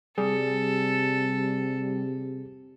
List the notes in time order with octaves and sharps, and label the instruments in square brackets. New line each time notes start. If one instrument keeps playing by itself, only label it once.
[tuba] C3 [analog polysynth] G3 [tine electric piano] G#4 [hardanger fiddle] A4